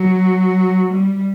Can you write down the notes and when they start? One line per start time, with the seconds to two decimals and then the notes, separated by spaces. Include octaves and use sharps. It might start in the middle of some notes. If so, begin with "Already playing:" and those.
Already playing: F#3
0.93 G3